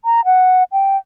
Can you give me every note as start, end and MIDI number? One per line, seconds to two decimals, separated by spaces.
0.05 0.24 82
0.25 0.63 78
0.72 0.97 79